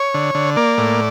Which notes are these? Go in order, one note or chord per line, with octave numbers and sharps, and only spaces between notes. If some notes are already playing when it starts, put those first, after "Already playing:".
Already playing: C#5
D3
D3
A#3 D5
A2